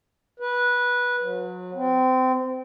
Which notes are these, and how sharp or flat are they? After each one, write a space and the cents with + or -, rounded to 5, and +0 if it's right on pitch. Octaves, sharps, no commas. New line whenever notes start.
B4 -15
F#3 -35
C4 -25